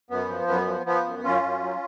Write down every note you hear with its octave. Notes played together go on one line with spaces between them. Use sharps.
F#2 B3
F3
F#2 B3
F3
F3 B3
F#2
F#2 C#4 F4
F#2
F#3